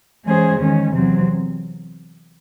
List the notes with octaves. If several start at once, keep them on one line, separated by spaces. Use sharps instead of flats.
E3 G#3 C#4 G#4 C5
E2 D#3 G#3 C#4
E2 C3 F#3 C4